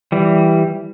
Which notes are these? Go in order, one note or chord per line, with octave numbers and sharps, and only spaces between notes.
E3 G3